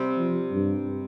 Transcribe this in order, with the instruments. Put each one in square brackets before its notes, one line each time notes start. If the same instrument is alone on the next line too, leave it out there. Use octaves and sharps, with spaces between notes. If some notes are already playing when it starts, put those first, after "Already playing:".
Already playing: [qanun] C3 G3 C4
[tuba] F3
G2